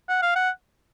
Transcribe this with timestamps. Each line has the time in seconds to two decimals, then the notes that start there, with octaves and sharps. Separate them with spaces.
0.09 F#5
0.22 F5
0.36 F#5